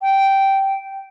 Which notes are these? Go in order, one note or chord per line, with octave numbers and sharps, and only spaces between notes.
G5